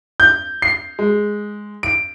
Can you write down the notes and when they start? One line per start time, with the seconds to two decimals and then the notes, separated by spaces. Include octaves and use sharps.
0.20 G6
0.62 C7
0.99 G#3
1.83 D7